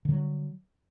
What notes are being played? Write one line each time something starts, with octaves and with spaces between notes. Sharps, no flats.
D3 F#3 G3